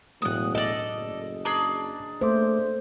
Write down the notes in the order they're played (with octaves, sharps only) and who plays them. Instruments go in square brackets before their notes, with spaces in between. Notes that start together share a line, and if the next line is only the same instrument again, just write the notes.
[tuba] E1 [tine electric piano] A2 F#3 A3 [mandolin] D#6 F#6
[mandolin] A4 D5 [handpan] D#5
[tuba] F#1
[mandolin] D4 G#4 [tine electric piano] A5 A#5 D6
[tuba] A3 [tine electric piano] A#3 E5 D6 [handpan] C5